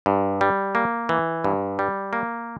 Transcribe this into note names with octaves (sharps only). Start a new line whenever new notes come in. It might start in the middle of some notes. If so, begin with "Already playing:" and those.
G2
G3
A#3
E3
G2
G3
A#3